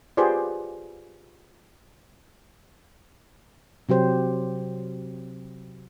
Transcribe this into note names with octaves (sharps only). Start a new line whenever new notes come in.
F4 G4 G#4 B4 C5 D5
C3 F#3 G4 C5